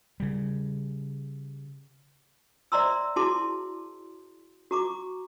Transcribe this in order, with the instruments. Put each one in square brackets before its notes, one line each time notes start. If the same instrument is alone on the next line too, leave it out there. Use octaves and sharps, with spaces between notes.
[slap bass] C#3 G3
[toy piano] C5 D5 E5 A#5 C6 E6
E4 F#4 G#4 A5 C6 D6
F#4 A#5 C#6 D6